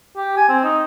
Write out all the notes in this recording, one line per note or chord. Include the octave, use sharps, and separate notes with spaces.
G4
G#5
C4
D#4